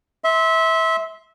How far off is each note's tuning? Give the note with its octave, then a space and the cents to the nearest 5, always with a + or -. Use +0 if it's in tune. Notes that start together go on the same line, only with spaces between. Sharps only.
E5 -20 C6 +0